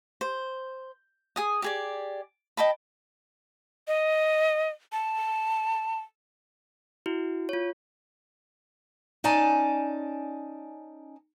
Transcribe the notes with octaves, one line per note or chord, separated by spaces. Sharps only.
C5
G#4 G#5 D#6
G4 G#4 D5
D#5 G5 A5 B5
D#5
A5
E4 F#4
F4 C#5
C#4 D#4 D5 G#5 A5